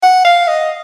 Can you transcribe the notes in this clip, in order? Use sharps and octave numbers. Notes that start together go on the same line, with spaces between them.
F#5
F5
D#5